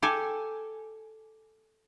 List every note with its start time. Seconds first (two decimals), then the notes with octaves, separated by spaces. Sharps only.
0.03 G4 A4 G#5